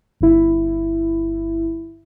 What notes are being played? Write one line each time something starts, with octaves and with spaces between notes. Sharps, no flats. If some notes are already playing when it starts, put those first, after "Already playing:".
G1 E4